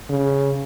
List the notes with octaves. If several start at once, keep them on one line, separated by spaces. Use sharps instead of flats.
C#3